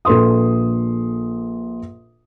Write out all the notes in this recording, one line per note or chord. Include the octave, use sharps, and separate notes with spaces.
A#1 A4 B4 C6 D#6